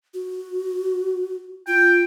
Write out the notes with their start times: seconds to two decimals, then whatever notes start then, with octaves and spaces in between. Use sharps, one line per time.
0.14 F#4
1.67 F4 G5